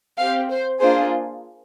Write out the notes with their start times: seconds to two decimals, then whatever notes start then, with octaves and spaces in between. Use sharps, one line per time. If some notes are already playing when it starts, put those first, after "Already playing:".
0.19 C4 G4 F5
0.50 C5
0.81 A#3 D4 F4 G#4 C5